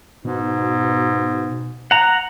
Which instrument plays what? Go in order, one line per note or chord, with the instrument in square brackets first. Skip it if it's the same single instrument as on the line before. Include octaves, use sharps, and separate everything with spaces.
[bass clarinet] G#2 [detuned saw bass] B2
[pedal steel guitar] F#5 A#5